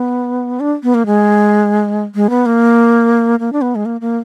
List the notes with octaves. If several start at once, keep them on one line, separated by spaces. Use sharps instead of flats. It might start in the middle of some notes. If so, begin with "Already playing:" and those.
Already playing: B3
D4
B3
A#3
G#3
G#3
B3
A#3
A#3
D4
B3
G#3
A#3
A#3